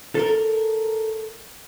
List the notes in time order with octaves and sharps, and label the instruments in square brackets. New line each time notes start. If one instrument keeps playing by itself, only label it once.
[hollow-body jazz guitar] A4 A#4